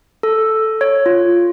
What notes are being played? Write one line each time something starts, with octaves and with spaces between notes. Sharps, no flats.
A4
C#5
F4